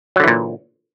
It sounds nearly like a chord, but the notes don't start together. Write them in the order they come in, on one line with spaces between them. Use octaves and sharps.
F#3 D3 E3 A#2